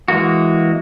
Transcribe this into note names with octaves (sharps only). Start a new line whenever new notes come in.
E3 G#3 A#3 F#4